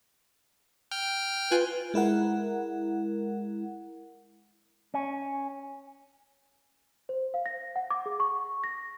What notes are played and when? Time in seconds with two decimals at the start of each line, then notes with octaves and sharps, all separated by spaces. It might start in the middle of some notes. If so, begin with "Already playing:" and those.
0.91 G5 F6
1.51 F4 B4 G#5 F#6
1.94 G#3 E4 A#4 F#5
4.94 C#4
7.09 C5
7.34 F5
7.46 A#6
7.76 F#5
7.90 D6
8.06 G#4
8.20 C#6
8.64 A#6